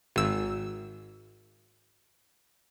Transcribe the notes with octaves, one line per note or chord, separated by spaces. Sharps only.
G#1 E6